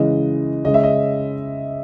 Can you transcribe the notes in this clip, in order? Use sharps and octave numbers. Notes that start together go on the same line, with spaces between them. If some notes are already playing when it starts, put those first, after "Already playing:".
Already playing: C#3 E3 G#3 D#5
C#3 G#3 C#4 D#5
E5
D#5